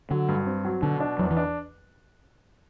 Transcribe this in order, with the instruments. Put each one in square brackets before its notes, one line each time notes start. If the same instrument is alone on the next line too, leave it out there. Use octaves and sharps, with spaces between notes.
[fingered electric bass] D3 [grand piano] F#3
[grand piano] G2
C4
F#3
[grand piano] B2 [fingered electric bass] D3
[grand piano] D4
[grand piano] E2 [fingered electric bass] F#3
[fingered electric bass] E3
[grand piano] D4